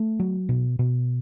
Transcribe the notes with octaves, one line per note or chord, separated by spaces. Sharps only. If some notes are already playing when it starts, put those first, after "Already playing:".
Already playing: A3
F#3
B2
B2